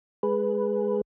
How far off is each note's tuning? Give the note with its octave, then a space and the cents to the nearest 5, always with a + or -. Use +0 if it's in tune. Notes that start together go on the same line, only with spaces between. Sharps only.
G#3 +0 G#4 +0 B4 +0